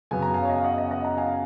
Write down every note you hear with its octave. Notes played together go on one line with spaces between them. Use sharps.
F#2 C#3 F#3 B3 G#5
A#5
F5 G#5
C#5
D#5
F5
D#5 F#5
D#5
D#5 F#5
F#5 A#5
F5 G#5